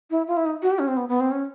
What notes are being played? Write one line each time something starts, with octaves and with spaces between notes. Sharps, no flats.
E4
F4
E4
D#4
F#4
G4
C#4
C4
B3
B3
C4
C#4